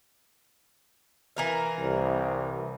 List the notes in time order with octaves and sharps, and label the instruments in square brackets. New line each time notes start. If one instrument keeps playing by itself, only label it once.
[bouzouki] E3 A#4 F5
[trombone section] C2